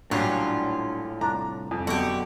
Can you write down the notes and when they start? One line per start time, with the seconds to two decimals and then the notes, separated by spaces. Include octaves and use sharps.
0.11 A#1 A2 F#3 G3 C#4 D4 F4
1.21 C2 D4 A#5
1.71 F2 G#5
1.87 F#2 B2 D3 F#4 G4